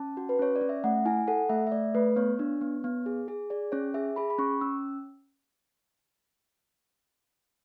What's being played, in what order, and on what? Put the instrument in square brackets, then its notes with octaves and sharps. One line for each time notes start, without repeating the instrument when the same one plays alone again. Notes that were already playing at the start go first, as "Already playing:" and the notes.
Already playing: [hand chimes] C#4 A5
F#4
B4
C#4 C#5
D5
C#4
E5
A3 F#5
E4 G#5
A4 F#5
A3 E5
E5
A3 D5
A3 B4
B3 C#5
D4
B3
B3
G#4
G#4
G#4 D5
C#4 C#5
G#4 E5
G#4 B5
B5
C#4 C#6
C#4 E6